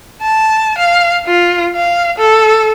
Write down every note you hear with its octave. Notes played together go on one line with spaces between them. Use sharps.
A5
F5
F4
F5
A4